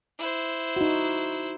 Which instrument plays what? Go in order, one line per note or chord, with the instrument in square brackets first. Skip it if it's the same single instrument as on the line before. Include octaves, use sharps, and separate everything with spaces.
[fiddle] E4 C5
[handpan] D#4 F#4